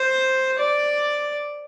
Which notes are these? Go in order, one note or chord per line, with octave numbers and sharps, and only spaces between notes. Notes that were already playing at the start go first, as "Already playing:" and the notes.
Already playing: C5
D5